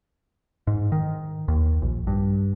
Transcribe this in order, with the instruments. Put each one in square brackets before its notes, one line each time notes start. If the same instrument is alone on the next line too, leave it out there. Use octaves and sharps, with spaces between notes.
[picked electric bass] G#2
D#3
D#2
A#1
G2